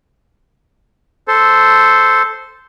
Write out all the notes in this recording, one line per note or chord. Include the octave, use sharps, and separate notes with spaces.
A4 C5